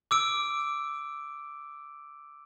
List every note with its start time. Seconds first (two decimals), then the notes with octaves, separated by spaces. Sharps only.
0.11 D6 E6 D7